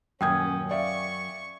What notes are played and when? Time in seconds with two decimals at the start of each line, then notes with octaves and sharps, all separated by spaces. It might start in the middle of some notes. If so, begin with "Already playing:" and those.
0.21 D#1 F#2 C#4 G5 D#6 G6 G#6
0.71 D5 E5 F5 C#6